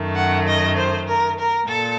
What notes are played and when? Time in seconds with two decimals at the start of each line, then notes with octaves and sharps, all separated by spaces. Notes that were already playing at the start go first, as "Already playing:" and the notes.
Already playing: F#2 D#3 A3
0.15 F#5
0.47 D#5
0.76 C5
1.07 A#4
1.38 A#4
1.67 A#2 A4